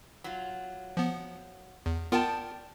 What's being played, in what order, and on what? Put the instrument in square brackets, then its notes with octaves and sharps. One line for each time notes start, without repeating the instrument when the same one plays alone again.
[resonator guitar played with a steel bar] F#3 F4
[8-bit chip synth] F3 B3
E2
[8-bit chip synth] B3 F4 A#4 [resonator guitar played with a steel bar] D5 G5 A5